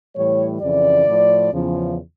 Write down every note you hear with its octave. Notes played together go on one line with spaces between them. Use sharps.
A2 E3 G3 C#5
F2 C#3 E3 D5
A2 F3
E2 C#3 F3